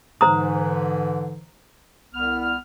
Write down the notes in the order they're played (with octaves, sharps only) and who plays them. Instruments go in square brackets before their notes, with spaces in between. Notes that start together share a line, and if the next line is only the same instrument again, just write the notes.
[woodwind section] G#2 D3 E3 [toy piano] C5 A#5 D#6
[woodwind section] C2 B3 F6